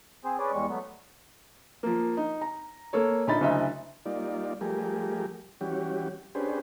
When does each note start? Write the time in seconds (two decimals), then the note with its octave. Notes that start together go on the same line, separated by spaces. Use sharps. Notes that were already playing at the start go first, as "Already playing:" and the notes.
0.25 C4 G#4 C5
0.39 C#4 G#4 B4 D5
0.53 E2 G3 G#3 C#6
0.69 F#3 A3 B3
1.83 F3 A#3
2.17 D#4
2.41 A#5
2.93 A#3 A4 C#5
3.27 A#1 D#4 B5 A6
3.41 F#1 D2 D#5 E5
4.06 G3 A#3 D#4 F4 D5
4.61 F3 G3 A3 G4 G#4 A#4
5.61 E3 G3 C#4 F#4 G4
6.35 C#4 D4 G4 G#4 B4 C5